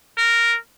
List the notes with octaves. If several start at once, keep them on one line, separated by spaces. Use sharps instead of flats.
A#4